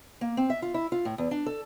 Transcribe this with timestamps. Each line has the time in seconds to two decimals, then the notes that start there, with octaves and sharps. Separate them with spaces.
0.21 A#3
0.37 C4
0.50 E5
0.62 F4
0.74 E4
0.92 F4
1.05 A2
1.18 E2
1.31 D4
1.46 A4